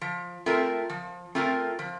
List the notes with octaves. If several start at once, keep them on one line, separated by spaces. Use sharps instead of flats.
F3
A3 C4 F4 A#4
F3
A3 C4 F4 A#4
F3